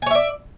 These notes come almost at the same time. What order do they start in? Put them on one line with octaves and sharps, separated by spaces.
G#5 C#5 E5 D5